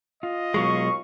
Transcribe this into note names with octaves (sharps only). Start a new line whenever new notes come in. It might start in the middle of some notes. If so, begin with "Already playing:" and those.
F4 D#5
D#2 B2 F#3 G#3 F5 C#6